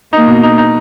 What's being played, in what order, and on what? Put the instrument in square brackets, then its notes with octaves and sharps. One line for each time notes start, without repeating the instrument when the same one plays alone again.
[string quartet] A#3 [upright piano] D#4
[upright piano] B2
D#4
D#4